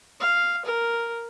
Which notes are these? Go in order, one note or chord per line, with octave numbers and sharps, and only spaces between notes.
F5
A#4